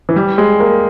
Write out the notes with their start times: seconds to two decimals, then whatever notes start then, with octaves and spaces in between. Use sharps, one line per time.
0.09 E3
0.16 G3
0.38 G#3
0.60 A#3